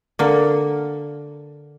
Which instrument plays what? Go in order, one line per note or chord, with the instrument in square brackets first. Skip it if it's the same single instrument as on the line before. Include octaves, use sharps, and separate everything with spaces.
[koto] D3 A#3